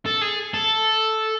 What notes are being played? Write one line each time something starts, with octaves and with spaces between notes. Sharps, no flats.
A4
G#4
A4